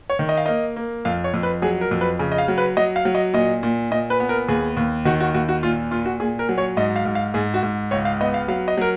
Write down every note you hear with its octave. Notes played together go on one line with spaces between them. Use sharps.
C#5
D#3
D#5
F5
A#3 D#5
A#3
F2 F5
C#5
F2
B4
F#3 G#4
A#4
F2
B4
C#3
D#5
F5
F#3
B4
F#3 D#5
F5
F#3
D#5
A#2 D#5
A#2
A#2 D#5
B4
B3
A#4
D#2 G#4
D#2
D#3 F#4
F#4
D#2 F#4
F#4
A#2 F4
A#2 F4
F#4
A#2 G#4
A#4
F#3
C#5
G#2 D#5
F5
G#2
F5
G#2 G#4
F#4
G#2
C#2 C#5
F5
B3 D#5
F5
F#3 F5
D#5
F#3 A#4